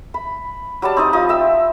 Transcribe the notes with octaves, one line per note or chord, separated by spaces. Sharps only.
B5
F#3 G3 D5 A5
C4 D#4 D#5
F3 D#4 D#6
E5 G5 E6